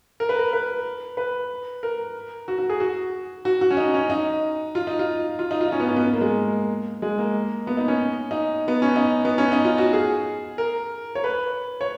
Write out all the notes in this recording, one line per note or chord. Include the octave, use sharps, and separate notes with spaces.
A#4
B4
A#4
B4
B4
A#4
F#4
F#4
G#4
F#4
F#4
F#4
C#4
D#4
C#4
D#4
F4
D#4
F4
F4
D#4
F4
D#4
C#4
B3
C#4
B3
A#3
G#3
G#3
A#3
B3
D#4
C#4
D#4
B3
C#4
D#4
B3
C#4
D#4
F4
F#4
G#4
A#4
C#5
B4
C#5